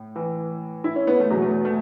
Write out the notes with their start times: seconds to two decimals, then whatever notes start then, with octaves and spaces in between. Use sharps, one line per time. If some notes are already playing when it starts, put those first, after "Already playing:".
Already playing: A2
0.16 E3
0.84 E4
0.96 C#4
1.07 B3
1.20 A3
1.30 E2 F#3
1.35 B2
1.42 A3
1.65 A3